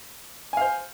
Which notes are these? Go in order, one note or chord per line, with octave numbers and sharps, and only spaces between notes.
C5 F5 G#5